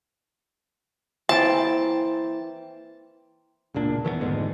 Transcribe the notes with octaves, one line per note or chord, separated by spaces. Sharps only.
E3 A#3 C4 C5 G5 A5
E1 C#2 A#2 D4
D#3 E3 A3 B3
F1 D2 G#2 G#3